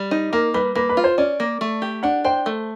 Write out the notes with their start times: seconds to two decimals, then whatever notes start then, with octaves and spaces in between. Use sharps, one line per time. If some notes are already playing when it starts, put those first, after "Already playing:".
Already playing: G3
0.11 D#4
0.32 A#3 A#4
0.54 G3 B4
0.75 A#3 B4
0.89 B4
0.97 F4
1.04 C5
1.18 C#4 D5
1.40 A#3
1.61 A3
1.82 G4
2.03 D4 F#5
2.24 C5 G5
2.46 A3